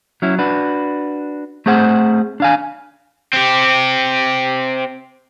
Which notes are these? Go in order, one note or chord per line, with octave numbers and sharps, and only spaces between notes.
F#3 C#4 E4
D4 F#4 B4
A3 C4 G#4 C5 F#5
D4 F5 G#5
C4 G4